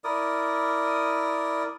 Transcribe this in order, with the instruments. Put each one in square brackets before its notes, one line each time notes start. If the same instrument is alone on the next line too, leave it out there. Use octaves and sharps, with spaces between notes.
[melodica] E4 A#4 D5 D#6